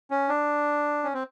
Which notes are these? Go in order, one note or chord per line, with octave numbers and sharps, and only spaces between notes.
C#4
D4
C#4
C4